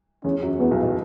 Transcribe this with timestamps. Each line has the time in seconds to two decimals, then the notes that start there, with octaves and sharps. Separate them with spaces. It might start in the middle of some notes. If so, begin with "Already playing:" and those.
0.24 E2 E3 C#4
0.42 F#2 F#3
0.60 E2 E3 B3
0.71 B1 B2
0.83 B2